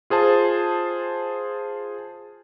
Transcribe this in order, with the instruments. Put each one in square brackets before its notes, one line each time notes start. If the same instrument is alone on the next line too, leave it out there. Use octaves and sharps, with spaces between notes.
[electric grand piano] F4 G#4 C5 A5